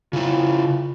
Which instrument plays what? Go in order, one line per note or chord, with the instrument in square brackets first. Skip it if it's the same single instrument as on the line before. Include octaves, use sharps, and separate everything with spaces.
[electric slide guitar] C#3 E4 [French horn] F4